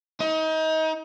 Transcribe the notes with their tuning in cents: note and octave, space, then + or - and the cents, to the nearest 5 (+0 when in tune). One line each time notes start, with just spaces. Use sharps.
D#4 +30